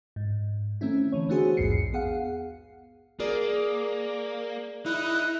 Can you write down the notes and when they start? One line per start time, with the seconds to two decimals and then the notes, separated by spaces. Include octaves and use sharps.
0.16 G#2
0.81 D#3 A3 C4 C#4 E4
1.12 D3 E3 C#5
1.29 A3 B3 D4 F#4 G#4 C5
1.57 A#1 E2 G#2 C7 C#7
1.93 B3 G#4 F5 F#5
3.20 A#3 G#4 A#4 D5
4.86 D#4 E4 F#6